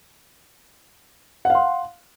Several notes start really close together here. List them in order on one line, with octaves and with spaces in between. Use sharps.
F#5 F5 C6